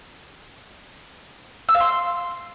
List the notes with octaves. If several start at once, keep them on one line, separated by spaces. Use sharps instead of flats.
E6
F5
C6